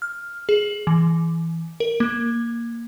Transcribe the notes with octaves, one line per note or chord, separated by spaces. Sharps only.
F6
G#4
E3
A#4
A#3